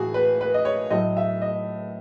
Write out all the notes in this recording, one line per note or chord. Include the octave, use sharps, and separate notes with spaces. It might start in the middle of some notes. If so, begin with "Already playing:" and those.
Already playing: A2 E3 F#4 G#4
B4
B4
D#5
C#5
A2 F#3 A3 D#5
E5
D#5